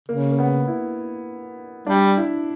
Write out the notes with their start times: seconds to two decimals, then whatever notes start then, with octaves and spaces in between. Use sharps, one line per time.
0.09 C#3 A#3
0.31 A#3
0.39 B3
0.67 E4
1.87 G3 D4
2.17 E4